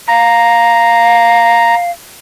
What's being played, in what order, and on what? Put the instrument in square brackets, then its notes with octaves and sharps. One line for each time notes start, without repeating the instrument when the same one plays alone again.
[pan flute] F5 [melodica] A#5